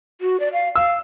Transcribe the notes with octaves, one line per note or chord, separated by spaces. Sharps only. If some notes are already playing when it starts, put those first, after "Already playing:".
F#4
D5
F5
F5 E6